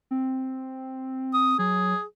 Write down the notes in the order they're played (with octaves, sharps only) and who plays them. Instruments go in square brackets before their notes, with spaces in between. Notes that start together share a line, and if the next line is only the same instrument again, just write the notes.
[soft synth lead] C4
[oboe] D#6
[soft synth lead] F#3 [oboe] G#4